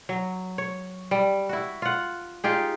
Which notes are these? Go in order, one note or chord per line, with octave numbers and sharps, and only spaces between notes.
F#3
C#5
G3
E4 F#4
F4 F#5
D#4 F4 G4 G#4